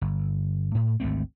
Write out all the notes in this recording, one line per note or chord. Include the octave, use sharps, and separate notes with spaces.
G1
A2
G#1 D2 A3 C4